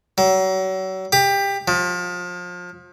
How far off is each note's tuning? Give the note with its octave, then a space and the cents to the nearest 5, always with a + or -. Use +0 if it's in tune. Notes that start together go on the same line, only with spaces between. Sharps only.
F#3 +35
G4 +20
F3 +30